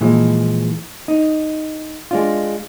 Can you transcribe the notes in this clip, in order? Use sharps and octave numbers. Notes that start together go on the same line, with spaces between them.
A#2 E3 F3 G#3
D#4
G#3 D4 F4